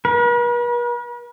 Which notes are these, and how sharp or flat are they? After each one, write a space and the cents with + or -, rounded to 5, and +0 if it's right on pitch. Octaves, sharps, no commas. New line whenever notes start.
B4 -45